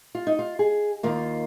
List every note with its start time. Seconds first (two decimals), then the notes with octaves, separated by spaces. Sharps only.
0.15 F4
0.27 D#4
0.39 F4
0.59 G#4
1.03 D#2 D#3 A#3 F4